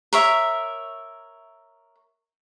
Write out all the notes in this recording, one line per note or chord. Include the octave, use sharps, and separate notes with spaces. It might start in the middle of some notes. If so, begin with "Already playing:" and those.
A#4 C#5 E5